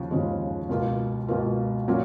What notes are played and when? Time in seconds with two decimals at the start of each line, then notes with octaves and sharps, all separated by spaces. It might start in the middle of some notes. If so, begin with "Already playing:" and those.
Already playing: D#2 C#3 F3
0.11 D#2 C#3 F3 G#3
0.69 C#2 B2 A#3 F4
1.28 C#2 B2 A#3 F4
1.88 A#2 F#3 C#4 F4